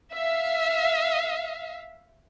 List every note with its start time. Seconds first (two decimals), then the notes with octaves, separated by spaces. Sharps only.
0.12 E5 F5